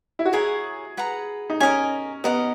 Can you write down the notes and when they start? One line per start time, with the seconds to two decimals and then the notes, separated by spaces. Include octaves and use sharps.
0.19 E4
0.25 F#4
0.33 E4 G#4 A#4 C#5 F#5
0.97 B4 F#5 A#5
1.50 D#4
1.60 C#4 A#4 D#5 G#5
2.24 B3 A#4 D#5 F#5